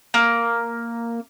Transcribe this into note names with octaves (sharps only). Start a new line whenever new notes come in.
A#3